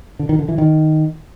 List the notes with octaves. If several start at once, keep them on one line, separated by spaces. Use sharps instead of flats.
D3
D#3
D3
E3
D#3